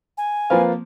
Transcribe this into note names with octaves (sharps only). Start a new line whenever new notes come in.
G#5
F3 A#3 C4 B4 F5